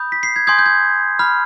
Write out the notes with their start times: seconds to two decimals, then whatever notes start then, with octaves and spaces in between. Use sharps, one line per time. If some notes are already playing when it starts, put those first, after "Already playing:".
Already playing: B5 D#6 G6
0.12 B6
0.23 C7
0.36 G#6
0.47 G#5 C6 D#6 G6 G#6
0.59 G6
0.66 G#6
1.19 B5 F6